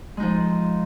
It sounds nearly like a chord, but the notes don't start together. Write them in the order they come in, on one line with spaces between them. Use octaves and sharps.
G#3 D#4 F3